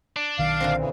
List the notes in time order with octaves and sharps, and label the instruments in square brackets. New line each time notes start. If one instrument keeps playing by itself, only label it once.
[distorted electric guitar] D4
[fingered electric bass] B1 D#3 [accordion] F5
[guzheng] A#2 D3 C4
[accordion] C#3 E3